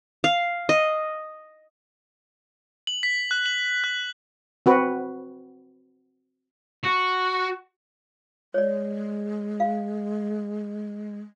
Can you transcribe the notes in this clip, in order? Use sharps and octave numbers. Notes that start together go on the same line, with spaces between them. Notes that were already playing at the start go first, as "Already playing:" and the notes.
F5
D#5
F#7
B6
F#6
F#7
F#6
C4 F#4 B4
F#4
G#3 C#5 D5
F5